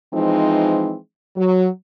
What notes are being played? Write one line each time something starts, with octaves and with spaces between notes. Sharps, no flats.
E3 F3 G#3 C4 D#4
F#3